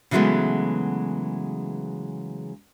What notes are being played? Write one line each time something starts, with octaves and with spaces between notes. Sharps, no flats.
C#3 E3 F#3 G#3 A3 B3